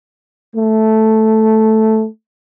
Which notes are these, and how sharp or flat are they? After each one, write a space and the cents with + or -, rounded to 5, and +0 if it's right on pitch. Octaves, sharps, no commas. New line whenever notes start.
A3 -5